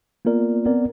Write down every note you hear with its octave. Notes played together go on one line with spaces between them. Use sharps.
A#3 B3 F4 A#4 D5
B3 C4 A#4 D5